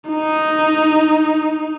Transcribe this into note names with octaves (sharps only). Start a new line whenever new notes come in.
D#4